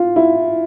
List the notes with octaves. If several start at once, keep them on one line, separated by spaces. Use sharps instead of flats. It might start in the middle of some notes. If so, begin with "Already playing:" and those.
Already playing: F4
E4